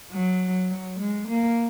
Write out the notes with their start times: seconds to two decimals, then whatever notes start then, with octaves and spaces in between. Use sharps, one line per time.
0.10 F#3
0.70 F#3
0.99 G#3
1.28 A#3